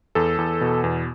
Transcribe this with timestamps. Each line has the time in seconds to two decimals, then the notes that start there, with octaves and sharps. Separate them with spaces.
0.15 E2 A4
0.38 E2
0.61 B2
0.84 E2